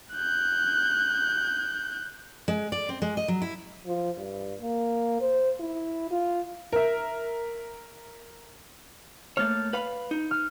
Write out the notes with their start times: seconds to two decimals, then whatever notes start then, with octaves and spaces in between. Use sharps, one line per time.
0.14 F#6 G6
2.48 G#3
2.72 D5
2.89 C4
3.02 G#3
3.17 D#5
3.28 F#3
3.42 E4
3.86 F3
4.18 G2
4.61 A#3
5.21 C5
5.60 E4
6.11 F4
6.72 A#4 E5
9.37 A3 A#3 C#5 F6 A6
9.73 B4 F5 B5
10.11 D#4
10.31 F6